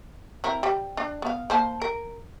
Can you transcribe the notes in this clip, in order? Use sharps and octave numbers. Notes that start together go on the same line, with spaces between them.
C4 E4 A#4
G3
D4
B3 F5
A#3 C5 A5
A#4